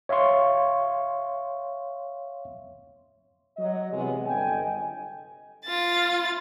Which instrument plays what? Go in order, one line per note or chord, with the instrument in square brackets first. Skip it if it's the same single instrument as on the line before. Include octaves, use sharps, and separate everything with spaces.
[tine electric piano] C#5 E5 F5 C6 C#6
[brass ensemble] F#3 D#5
C3 E3 F#3 G#3 B3
G1 D#5 G5 G#5
[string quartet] F4 A6